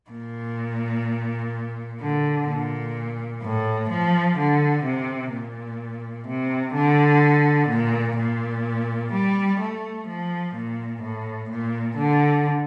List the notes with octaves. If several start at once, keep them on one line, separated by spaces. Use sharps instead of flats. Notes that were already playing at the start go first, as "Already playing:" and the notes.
A#2
D3
A#2
A2
F3
D3
C3
A#2
C3
D3
A#2
A#2
G3
A3
F3
A#2
A2
A#2
D3